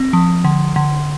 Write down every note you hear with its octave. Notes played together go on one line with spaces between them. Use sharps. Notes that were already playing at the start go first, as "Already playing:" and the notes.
Already playing: C4
F3
D3
D3